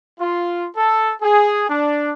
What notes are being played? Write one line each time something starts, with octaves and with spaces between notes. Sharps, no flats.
F4
A4
G#4
D4